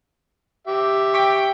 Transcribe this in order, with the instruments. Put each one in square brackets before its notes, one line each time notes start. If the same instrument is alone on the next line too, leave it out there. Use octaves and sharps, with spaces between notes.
[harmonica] G4 E5
[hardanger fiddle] G5 [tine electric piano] C#6 D6 B6